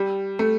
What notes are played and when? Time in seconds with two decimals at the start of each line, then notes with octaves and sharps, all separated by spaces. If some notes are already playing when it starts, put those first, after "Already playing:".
Already playing: G3
0.39 A3